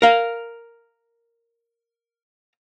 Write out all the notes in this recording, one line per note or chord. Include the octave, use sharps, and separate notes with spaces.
A#4 F5